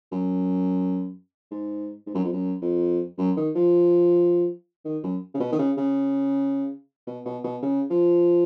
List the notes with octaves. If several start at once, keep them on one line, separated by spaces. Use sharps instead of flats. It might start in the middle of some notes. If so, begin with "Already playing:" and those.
F#2
G#2
G#2
F#2
F2
F#2
F2
F#2
D#3
F3
D#3
F#2
C#3
B2
D#3
C#3
C#3
B2
B2
B2
C#3
F3